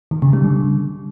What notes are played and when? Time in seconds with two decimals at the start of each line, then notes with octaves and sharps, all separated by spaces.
0.11 D#3
0.22 C#3
0.33 G3
0.44 D3